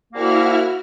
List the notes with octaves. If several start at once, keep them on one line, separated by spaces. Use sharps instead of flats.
C2 A#3 E4 F#4 F6